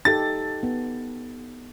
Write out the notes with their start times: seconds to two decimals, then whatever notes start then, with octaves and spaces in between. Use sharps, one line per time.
0.05 D#4 G4 A4 A6
0.63 B3